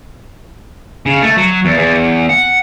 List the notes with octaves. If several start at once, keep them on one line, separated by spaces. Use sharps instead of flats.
C#3
A3
F#3
E2
E2
F#5